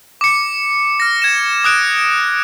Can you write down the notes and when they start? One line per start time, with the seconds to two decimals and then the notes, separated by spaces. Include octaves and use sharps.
0.21 D6 C#7
1.00 F6 A#6
1.22 G#6 E7
1.64 D#6 F#6 D7